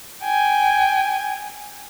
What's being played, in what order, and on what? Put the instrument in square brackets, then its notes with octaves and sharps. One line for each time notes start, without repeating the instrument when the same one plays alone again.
[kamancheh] G5 G#5